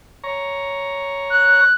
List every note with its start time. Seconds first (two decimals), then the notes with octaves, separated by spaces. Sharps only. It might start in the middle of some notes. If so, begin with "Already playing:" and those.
0.23 C#5 A#5
1.30 F#6